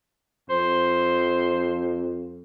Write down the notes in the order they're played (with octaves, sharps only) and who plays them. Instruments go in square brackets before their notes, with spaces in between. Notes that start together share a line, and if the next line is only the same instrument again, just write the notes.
[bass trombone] F2 [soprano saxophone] C5